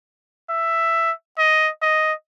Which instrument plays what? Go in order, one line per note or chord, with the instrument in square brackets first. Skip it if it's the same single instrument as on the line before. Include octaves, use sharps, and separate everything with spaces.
[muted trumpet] E5
D#5
D#5